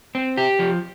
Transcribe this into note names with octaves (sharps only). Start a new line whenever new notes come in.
C4
G4
F3